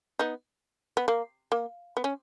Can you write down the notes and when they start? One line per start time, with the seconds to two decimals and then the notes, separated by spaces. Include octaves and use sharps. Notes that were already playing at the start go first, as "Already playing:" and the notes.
0.19 B3 D#4
0.97 B3
1.08 A#3
1.52 A#3
1.97 B3
2.04 C#4